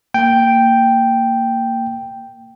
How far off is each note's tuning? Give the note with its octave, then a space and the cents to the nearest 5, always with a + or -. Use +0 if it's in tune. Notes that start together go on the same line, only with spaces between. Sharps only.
A#3 -15 G5 +0